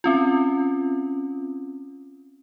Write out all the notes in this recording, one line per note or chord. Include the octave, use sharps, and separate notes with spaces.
C4 C#4 F4